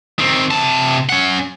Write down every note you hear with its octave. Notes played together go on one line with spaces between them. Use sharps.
D#3 C4
C3 A5
C#4 F#5